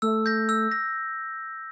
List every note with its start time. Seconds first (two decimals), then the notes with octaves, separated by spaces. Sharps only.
0.02 A3 E6
0.26 G6 A#6
0.49 E6
0.72 A#6